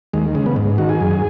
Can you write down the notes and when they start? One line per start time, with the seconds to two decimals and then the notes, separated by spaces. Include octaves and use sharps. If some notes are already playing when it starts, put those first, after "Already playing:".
0.13 D#2 G#3
0.35 C#3 G#3
0.46 B3
0.56 G#2
0.78 D#3 F#4
0.89 G#4
1.01 F#2